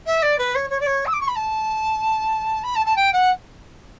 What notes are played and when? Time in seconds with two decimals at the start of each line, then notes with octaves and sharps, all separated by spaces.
0.06 E5
0.22 D5
0.38 B4
0.54 C#5
0.69 C#5
0.80 D5
0.86 C#5
1.06 E6
1.13 D6
1.20 C#6
1.27 B5
1.35 A5
2.63 B5
2.75 A5
2.85 A5
2.96 G5
3.12 F#5